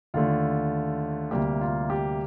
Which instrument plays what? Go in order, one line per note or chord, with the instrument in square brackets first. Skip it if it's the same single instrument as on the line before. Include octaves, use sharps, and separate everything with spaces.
[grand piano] D#2 D3 A3 F4
D2 C3 G3 A#3 G4
F4
G4